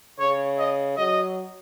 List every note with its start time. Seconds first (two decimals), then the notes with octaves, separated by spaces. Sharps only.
0.19 C#3 C#5
0.59 D#5
0.97 F#3 D#5